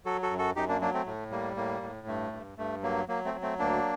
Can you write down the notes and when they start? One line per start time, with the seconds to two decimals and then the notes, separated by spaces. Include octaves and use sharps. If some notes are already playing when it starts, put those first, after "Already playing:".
0.05 F#3 F#4 A4
0.23 F#4 A4
0.31 F#2
0.39 F#4 A4
0.56 F#2 D#4 G4
0.69 A#3 D4
0.81 F#3 A#3 D4
0.94 A3 C4
1.06 A2 A3
1.31 G3 A#3
1.56 A2 A#3
1.82 A2
2.07 G2 A3
2.33 G2
2.58 G2 A3
2.83 F#3 A#3
3.08 F#3 A#3
3.25 A3 C4
3.34 F#3
3.42 A3 C4
3.59 D2 A#3 D4